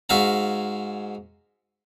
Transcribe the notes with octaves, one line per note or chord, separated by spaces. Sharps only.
G#2 F#4 E5 F5 A#5